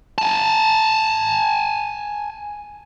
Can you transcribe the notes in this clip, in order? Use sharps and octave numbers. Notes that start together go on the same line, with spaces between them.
G#5 A5